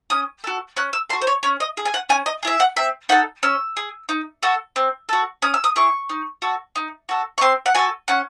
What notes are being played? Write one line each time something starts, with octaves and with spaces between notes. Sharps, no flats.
C#4 D#6
F#4 A4
C#4 F#6
E6
F#4 A4 C6
C5
C#5
C#4 C#5
D#5
G#4
G#5
F#5
C#4 G#5
D#5
E4 G#4 E5
F#5
C4 E5
D#4 A4 F#5
C#4 E6
G#4
D#4
F#4 A4
C4
F#4 A4
C#4 D#6
E6
D#6
E4 G#4 C#6
D#4
F#4 A4
D#4
F#4 A4
C#6
C4 C6
F#5
F#4 A4 G#5
C#4 F#5